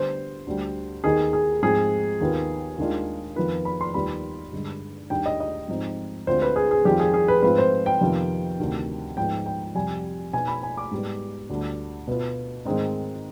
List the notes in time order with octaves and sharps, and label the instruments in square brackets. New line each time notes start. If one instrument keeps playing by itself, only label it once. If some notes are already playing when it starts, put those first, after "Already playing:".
Already playing: [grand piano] D3 G3 B3 C5
D2 D3 G3
D#2 D#3 B3 D#4 G#4
G#4
G#2 F3 C4 G#4
D#2 D#3 B3 F4
D#2 D#3 G#3 D4 F4
F2 D#3 B3 F4 B4
B5
C6
D#2 D#3 G3 B3 F4 B5
G2 D3 G#3
D#2 D#3 G3 D4 G5
D#5
D#5
G#2 F3 C4 D#4
D2 D3 G#3 C4 F4 C5
B4
G#4
G#4
F2 D#3 G3 C4 F4 G4
G#4
G#4
B4
G#2 F3 C4 F4 B4
C5
G5
F2 C3 D#3 B3 F4
D2 C3 D#3
G#2 F3 B3 D#4 G5
G5
F2 C3 G3 G#5
B2 B3 D#4 G#5
B5
G#5
D6
G#2 G3 B3
D2 D3 G3 D4
B2 B3 F4
G#2 D#3 G#3 C4 D#4